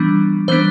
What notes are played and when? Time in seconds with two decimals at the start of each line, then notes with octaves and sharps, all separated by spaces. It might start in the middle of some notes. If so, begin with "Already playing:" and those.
Already playing: E3 G3 B3 D4
0.48 E3 G3 B3 D4 C5